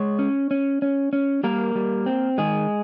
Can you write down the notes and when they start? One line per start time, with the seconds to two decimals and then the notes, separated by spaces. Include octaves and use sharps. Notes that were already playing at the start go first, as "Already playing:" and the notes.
Already playing: G#3 C#5
0.19 C#4
0.51 C#4
0.82 C#4
1.13 C#4
1.44 G3 A#3 A#4
1.75 G3
2.06 C4
2.38 D#3 G#3 G#4